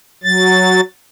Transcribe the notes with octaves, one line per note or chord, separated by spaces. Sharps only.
F#3 A6